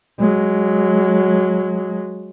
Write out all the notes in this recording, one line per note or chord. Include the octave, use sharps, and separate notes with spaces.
F#3 G#3